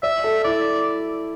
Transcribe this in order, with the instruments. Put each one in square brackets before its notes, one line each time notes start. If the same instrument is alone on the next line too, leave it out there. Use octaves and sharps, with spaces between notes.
[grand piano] D5 [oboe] E5
[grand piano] A4
[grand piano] E4 [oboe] D5